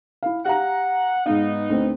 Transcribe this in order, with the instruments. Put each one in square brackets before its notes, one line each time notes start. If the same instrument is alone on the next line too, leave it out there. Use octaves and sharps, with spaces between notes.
[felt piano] E4 F5
[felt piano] G4 F5 A#5 [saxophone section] F#5
[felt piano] G#2 F5 [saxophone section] B3 D#4
[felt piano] D2 C4